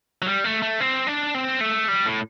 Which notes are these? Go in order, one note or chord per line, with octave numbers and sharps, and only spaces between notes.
F#3
G3
A3
A3
C4
D4
C4
A3
G3
A2